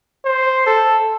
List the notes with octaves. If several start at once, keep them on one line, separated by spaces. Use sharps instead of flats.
C5
A4